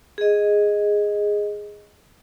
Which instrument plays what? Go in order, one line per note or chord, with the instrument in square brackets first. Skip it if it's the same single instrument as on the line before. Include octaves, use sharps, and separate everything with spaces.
[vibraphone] G#4 D#5